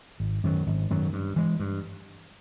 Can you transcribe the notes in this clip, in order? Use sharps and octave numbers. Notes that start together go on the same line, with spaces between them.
G#1
F#2 D#3 F#3
G#1
F#2 D#3 F#3
G2
E3 G#3
G2